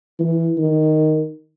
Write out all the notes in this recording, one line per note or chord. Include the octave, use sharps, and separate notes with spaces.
E3
D#3